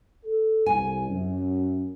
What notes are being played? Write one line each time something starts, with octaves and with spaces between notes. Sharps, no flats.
A4
C2 G#5
F#2